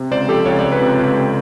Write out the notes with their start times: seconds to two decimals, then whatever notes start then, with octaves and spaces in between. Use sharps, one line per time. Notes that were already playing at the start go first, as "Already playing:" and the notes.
Already playing: C3
0.11 C#2 C5 D5
0.28 F3 G4 A4
0.45 C#2 C#5
0.59 C#2 D5
0.72 B4 C#5
0.82 C3
0.99 C#2
1.16 C3